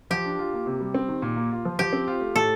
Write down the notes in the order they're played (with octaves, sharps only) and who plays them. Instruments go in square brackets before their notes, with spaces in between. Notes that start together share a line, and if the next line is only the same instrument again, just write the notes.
[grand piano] F3 [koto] G4
[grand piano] D4
F4
A#3
C3
G3
C4
D#3
A#2
A#3
F4
F3
[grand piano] F3 [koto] G4
[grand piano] C4
F4
A3
[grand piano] A2 [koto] A4